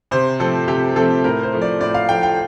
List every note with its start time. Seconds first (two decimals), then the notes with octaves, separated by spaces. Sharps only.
0.11 C3 C5
0.40 F3 A3 C4 A4
0.68 C3 G4
0.96 F3 A3 C4 A4
1.24 A2 A#4
1.43 C5
1.53 F3 A3
1.62 D5
1.80 A2 D5
1.94 F5
2.09 F3 A3 G5
2.23 G5